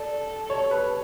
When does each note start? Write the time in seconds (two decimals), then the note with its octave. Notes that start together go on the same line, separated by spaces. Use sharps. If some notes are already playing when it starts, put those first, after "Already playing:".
Already playing: A4 D5
0.50 C#5
0.71 B4